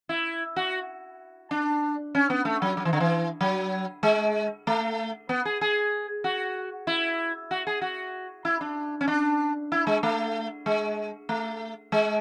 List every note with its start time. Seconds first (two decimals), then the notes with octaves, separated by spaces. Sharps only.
0.09 E4
0.56 F#4
1.51 D4
2.15 C#4
2.30 B3
2.45 A3
2.62 F#3
2.77 F#3
2.85 E3
2.93 D3
3.00 E3
3.41 F#3
4.03 G#3
4.67 A3
5.29 B3
5.45 G#4
5.61 G#4
6.24 F#4
6.87 E4
7.51 F#4
7.67 G#4
7.81 F#4
8.45 E4
8.61 D4
9.01 C#4
9.08 D4
9.72 E4
9.87 G#3
10.03 A3
10.66 G#3
11.29 A3
11.92 G#3